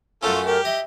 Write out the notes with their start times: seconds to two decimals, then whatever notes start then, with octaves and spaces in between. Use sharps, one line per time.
0.23 F#2 A3 C#4 F4 A4
0.46 G4 A#4
0.65 D#5 E5